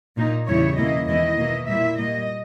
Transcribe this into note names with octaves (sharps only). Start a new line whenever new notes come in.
A#2 A#3 D#4
E2 C#3 G3 C#4 E4 C#5
E2 B2 A#3 C#4 E4 D#5
E2 D#3 G#3 B3 E4 D#5
B2 A#3 E4
A#2 G3 A#3 E4 E5
A#2 G3 A#3 D#5